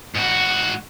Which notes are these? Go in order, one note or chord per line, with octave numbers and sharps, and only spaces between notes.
G#2 F#4